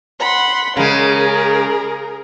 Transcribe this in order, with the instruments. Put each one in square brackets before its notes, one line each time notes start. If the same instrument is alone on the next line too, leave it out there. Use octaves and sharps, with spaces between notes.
[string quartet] F#5 B5 C6
[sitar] C#3 G#3 [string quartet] G#4 A#4